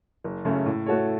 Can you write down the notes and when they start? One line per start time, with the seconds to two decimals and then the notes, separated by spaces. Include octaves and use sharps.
0.24 F#1
0.45 F#2 C#3 A3 C#4
0.66 A2
0.86 A3 F#4 A4 C#5